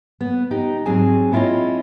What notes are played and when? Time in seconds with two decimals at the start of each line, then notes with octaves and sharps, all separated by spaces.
0.21 B3
0.51 D#4 G4
0.86 G#2 F#3 C4 G#4 G#5 A5
1.32 B3 C4 E4 F4 C#5 D#5